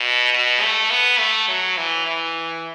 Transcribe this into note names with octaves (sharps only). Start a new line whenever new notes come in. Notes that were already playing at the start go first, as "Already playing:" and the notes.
Already playing: B2
B2
A3
B3
A3
F#3
E3
E3